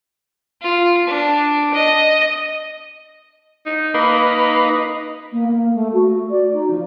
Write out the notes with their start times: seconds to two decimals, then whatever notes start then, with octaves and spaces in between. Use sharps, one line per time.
0.62 F4
1.07 D4
1.74 D#5
3.66 D#4
3.94 A#3 D#4 B4
5.32 A#3
5.50 A#3
5.74 A3
5.93 F#4
6.30 D5
6.53 D#4
6.71 F3